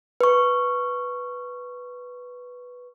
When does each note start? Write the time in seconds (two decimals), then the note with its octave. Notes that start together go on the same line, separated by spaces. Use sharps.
0.21 B4 C#6